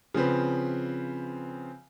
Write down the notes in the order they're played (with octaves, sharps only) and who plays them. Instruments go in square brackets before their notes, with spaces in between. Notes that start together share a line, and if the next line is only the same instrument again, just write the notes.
[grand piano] C#3 F3 C4 B4